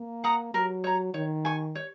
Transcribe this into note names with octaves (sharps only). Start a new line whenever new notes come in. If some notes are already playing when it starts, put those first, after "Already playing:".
Already playing: A#3
F#5 A#5 D#6
F#3 A#4
C#5 A#5
D#3 C#5
G#5 C#6
C#5